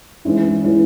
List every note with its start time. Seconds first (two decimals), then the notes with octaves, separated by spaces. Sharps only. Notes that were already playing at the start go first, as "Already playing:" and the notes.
0.25 G#2 E3 G#3 C#4 E4
0.63 E3 G#3 C#4 E4